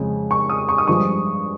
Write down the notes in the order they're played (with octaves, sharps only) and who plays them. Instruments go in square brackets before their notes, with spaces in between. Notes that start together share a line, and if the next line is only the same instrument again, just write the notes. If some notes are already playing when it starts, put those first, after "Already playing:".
Already playing: [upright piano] F2 C#3 G#3
C#6
D#6
C#6
D#6
G2 F3 G#3 C#6